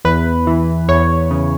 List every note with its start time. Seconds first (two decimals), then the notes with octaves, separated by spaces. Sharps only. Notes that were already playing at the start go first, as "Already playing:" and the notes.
0.05 E2 B4
0.47 E3
0.89 E2 C#5
1.31 C#3